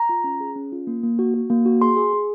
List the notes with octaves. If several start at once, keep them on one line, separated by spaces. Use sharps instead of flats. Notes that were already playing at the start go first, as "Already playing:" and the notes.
Already playing: A#5
F4
C#4
G#4
C#4
F4
A#3
A#3
F#4
F#4
A#3
F#4
G#4 C6
G#4
G#4